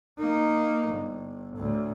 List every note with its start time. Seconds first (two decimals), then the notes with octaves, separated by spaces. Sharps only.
0.18 A#3 D#4
0.88 G1
1.56 D2 A2